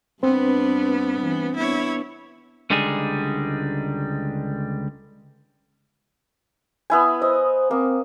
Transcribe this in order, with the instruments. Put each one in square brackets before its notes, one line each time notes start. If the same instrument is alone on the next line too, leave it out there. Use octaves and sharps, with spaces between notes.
[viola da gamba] G2 D4 B4 [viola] B3 [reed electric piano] C4 C5
[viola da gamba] E3
[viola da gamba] B3 D4 [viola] E4 C#5
[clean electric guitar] C#2 D3 G3 G#3 D#4 G#4
[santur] B3 E4 G#5
[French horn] C5 [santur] D#5
[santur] A#3 [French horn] C4